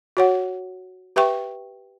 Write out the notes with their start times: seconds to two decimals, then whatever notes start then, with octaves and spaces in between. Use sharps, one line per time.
0.17 F#4 C#5 F#5
1.16 G4 B4 E5 G5 C#6